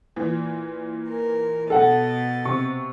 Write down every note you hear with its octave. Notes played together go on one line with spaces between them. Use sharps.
A#2 E3
A#4
B2 A4 D#5 F#5 A6
C3 C#6